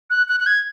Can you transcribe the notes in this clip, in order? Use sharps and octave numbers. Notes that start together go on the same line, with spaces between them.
F#6
F#6
F#6
G#6